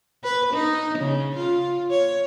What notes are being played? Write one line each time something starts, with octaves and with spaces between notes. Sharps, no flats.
B4
D#4
C#3
F4
C#5